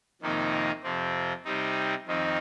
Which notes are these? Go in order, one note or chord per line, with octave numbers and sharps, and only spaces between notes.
F2 C3 D#3 A#3 D#4
F2 C3 F3 C4
C3 G3 C4 D#4
F2 D#3 C4 D#4